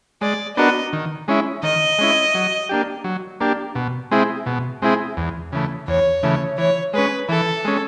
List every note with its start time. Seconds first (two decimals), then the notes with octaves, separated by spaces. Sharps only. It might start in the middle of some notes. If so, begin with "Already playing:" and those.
0.21 G#3 D5
0.57 B3 D4 F#4 A#4 D#5
0.93 D#3
1.28 G#3 C#4 E4
1.63 D#3 D#5
1.99 G#3 C#4 E4
2.35 F#3
2.69 A#3 D4 G4
3.04 F#3
3.41 A#3 D4 G4
3.75 B2
4.11 G#3 C4 E4 G#4
4.46 B2
4.82 G#3 C4 E4 G#4
5.17 E2
5.52 C#3 E3 A3
5.88 E2 C#5
6.23 C#3 E3 A3
6.58 E3 C#5
6.94 G#3 C#4 B4
7.29 E3 A4
7.65 G#3 C#4